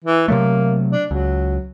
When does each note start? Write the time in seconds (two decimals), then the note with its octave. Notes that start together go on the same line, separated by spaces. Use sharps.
0.05 E3
0.28 C3 F#3 A3 A#3
0.91 D4
1.11 C#2 F#3